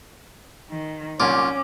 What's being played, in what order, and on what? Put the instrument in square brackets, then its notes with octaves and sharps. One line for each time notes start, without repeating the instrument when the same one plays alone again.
[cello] D#3
[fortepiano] C2 F#2 A#2 [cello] C#4 [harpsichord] F4 [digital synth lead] D6